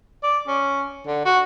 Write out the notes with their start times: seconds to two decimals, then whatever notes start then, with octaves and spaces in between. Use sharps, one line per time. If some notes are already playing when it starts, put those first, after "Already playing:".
0.23 D5
0.47 C#4
1.07 D3
1.25 F#4